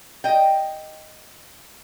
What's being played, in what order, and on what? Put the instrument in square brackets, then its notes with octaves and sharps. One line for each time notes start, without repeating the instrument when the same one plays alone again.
[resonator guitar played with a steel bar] D#5 G5